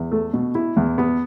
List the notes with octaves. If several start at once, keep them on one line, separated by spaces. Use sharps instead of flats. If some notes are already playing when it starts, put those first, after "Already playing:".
Already playing: E2
A3
B2
E4
E2
B3